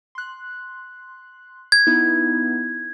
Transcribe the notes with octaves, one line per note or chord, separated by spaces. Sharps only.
C6 F#6
G#6
B3 D#4 E4